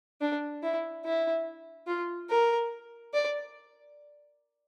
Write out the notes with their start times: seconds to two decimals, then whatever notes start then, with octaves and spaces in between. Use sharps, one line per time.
0.21 D4
0.63 E4
1.05 E4
1.87 F4
2.30 A#4
3.14 D5